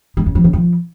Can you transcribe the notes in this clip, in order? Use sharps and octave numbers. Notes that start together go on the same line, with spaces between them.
G#3
C#3
F3
C#3
F3